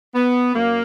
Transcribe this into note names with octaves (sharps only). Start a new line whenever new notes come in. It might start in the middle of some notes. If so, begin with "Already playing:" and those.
B3
F#2 A#3